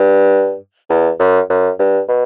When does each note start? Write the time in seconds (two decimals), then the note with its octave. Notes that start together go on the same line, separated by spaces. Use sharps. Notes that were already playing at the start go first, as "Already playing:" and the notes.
Already playing: G2
0.90 E2
1.20 F#2
1.50 F#2
1.79 G2
2.09 B2